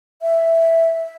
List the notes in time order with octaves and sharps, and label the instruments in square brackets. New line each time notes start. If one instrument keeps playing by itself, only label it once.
[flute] E5